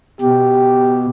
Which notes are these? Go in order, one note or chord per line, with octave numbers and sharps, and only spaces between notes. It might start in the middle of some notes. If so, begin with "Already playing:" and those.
B2 G4